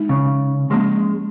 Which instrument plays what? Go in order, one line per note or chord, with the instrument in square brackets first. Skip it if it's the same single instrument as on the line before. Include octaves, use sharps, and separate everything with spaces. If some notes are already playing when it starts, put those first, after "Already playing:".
Already playing: [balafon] G#3 D#4
[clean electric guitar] C#3
[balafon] F3 A#3 C#4 [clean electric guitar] G#3